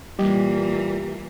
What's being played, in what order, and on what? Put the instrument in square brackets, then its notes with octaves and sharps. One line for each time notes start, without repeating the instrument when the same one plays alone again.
[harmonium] A#2 [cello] E3 A#3 [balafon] G3 [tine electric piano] G4